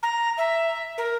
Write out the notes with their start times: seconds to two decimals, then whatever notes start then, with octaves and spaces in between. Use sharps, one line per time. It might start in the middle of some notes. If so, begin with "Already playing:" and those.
0.03 A#5
0.38 E5
0.98 A#4